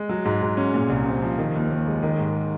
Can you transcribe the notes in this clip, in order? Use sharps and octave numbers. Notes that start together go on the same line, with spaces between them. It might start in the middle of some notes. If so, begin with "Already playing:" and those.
Already playing: G#3
F#3
G#2
G#2
C#4
A#2
C2
C4
F3
D#3
D#2
D#2
G#3
D#3
G#2